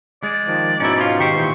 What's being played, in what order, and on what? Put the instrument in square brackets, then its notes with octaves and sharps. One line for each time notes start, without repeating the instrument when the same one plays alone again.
[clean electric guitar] G#3 [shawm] D5
[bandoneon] D#3 F3
[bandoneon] G#2 B2 D#4 [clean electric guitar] C#4 E4
[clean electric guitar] C#4 F4
[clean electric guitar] D#3 G4 C5 [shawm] C#6
[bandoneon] A#2 E3 G6